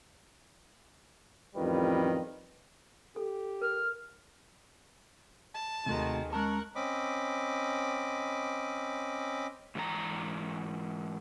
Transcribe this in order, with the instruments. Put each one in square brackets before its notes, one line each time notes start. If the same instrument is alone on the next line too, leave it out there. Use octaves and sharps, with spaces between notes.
[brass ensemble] A1 F2 D#3 G3 F4 B4
[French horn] G4 [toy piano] A4
[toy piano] A#4 [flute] F6
[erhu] A5
[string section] D#2 D#3 G#3 [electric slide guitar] C3 A3 F#4
[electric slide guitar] G#3 C#4 A5 [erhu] A#4 [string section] C#6 F#6
[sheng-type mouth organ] C4 C#4 D#5 B5 D6
[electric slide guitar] G#2 E3 D4 A4 A#5